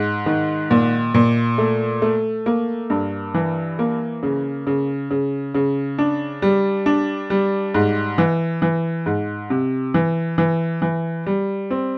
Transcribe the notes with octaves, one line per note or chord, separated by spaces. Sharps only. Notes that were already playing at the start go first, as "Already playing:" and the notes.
Already playing: G#2
D#3
A#2
A#2
A3
A3
A#3
G2
E3
A#3
C#3
C#3
C#3
C#3
D4
G3
D4
G3
G#2
E3
E3
G#2
C3
E3
E3
E3
G3
C4